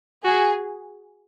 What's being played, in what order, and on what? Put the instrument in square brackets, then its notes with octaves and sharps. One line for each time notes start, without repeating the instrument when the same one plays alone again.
[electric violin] F#4 [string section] G#4